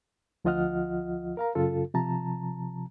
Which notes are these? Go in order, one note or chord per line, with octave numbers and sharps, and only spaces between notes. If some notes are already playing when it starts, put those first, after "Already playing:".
D2 F3 F4 D#5 F#5 F6
A#4 F5 A#5
F#2 C#3 F4 A4
C3 F3 A5 A#5